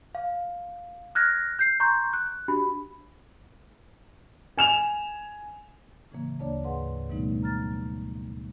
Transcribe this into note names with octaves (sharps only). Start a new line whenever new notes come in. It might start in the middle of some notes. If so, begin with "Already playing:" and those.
F5
F6 F#6 G#6 A#6
G6 C7
A#5 C6 C#6 G6
F#6
D4 F#4 G4 B5
G#5 E7 F7
A2 C#3 E3 F#3 A#3
D2 A#3 D4 C#5 D5 A5
G#2 G#4 B4 F5 F#5 C6
B2 E3 G3 A3 B3 D#4
F#3 A#5 F6 A6